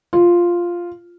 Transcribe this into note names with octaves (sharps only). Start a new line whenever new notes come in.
F4